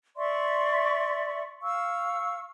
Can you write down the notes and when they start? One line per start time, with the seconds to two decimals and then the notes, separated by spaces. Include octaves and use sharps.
0.17 D5 E5 C6 C#6
1.62 F5 C#6 E6